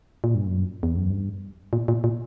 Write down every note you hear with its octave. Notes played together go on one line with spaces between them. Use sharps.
A#2
G2
F#2
E2
F#2
G2
A#2
A#2
A#2